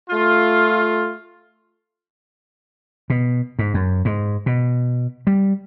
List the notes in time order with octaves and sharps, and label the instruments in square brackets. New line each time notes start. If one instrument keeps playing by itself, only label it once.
[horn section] A3 F4
[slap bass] B2
G#2
F#2
G#2
B2
G3